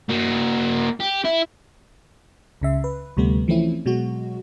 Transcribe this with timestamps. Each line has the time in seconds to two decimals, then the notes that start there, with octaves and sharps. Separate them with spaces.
0.10 A#3 F#4
1.00 G4
1.24 E4
2.61 C#2 C#3 E5
2.84 B4
3.17 D2 C3 G3 A3 B3
3.48 E3 F3 A3 C4 C#4 E4
3.86 B2 F#3 G#3 F#4